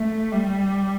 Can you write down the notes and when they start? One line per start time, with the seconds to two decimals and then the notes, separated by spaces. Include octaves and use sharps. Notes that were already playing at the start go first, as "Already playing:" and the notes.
Already playing: A3
0.32 G3